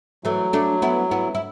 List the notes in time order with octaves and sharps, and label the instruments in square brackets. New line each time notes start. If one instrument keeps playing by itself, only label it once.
[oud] E3 A3 [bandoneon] F#3
[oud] A3 D4
B3 E4
B3 E4
E4